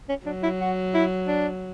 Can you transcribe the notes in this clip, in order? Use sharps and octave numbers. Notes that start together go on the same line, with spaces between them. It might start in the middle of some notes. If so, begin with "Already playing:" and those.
C#4
F#3 D4
E4
F#4
E4
D4